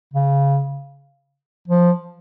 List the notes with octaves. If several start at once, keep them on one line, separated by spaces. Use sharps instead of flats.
C#3
F3